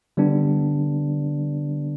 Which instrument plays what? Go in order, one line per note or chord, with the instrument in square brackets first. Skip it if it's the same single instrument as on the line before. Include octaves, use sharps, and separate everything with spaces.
[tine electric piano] D3 G3 B3 D4